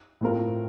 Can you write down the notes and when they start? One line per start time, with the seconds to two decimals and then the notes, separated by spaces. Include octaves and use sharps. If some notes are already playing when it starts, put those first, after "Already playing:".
0.21 A2 A3 C4 F4 A#4